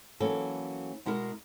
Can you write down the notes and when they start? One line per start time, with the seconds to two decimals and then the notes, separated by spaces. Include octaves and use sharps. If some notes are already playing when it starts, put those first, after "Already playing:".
0.20 E3 F#3 A#3 C#4 A4
1.06 B2 G#3 E4 F#4 A#4